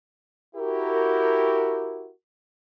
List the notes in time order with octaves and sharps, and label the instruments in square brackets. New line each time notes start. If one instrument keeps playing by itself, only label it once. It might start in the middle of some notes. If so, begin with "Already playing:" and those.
[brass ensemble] E4 F#4 G4 A#4